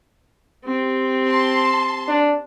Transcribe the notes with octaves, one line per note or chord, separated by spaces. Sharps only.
C4 G4
A5 C6
D4